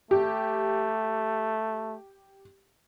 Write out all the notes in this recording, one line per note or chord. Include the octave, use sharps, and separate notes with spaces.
A3 G4